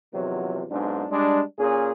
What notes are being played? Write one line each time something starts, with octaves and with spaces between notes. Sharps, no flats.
E2 C3 D#3 F3 F#3
B1 G#2 C#4 D4
G3 G#3 D4
A#2 C#4 G#4